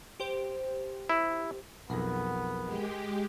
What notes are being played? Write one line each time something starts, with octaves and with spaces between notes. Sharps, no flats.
G4 C5
E4
B1 F2 B3 G#4 A#4 F#5
G#3 G4